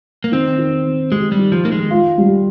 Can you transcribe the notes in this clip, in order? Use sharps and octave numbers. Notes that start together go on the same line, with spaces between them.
A#3
D#3 C4
D#3
D#3
G#3 G4
G3
D#3
F3
D#3 A#3
G#3
F4
G3